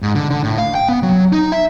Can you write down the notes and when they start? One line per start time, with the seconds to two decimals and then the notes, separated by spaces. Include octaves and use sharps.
0.02 G#2
0.15 D3
0.30 D3
0.43 A2
0.58 F5
0.75 G5
0.89 B3
1.03 F#3
1.33 D#4
1.52 E5